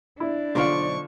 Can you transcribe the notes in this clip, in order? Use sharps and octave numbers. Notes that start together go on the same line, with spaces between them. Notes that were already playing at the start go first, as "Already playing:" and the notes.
D4 E4
B1 D3 F3 C5 D5 F5 C#6